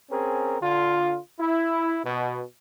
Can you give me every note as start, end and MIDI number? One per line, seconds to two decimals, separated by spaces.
0.10 0.57 60
0.10 0.57 61
0.10 0.57 68
0.10 0.57 70
0.61 1.17 50
0.61 1.17 65
1.40 1.98 64
2.04 2.40 47